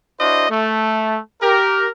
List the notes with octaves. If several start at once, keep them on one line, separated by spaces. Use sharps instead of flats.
D4 E4 F#4 C5 D#5
A3
G4 A#4